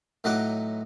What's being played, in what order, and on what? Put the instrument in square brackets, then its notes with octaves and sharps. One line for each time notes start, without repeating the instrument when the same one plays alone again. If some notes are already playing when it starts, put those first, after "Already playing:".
[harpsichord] A2 F#3 D#4 B4 D#5 D6